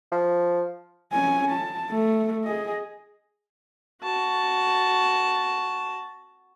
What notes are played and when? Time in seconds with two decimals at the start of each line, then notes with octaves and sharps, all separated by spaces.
0.12 F3
1.13 C#4 G#5
1.52 A5
1.91 A3
2.45 G#4 D#5
4.03 F#4 A5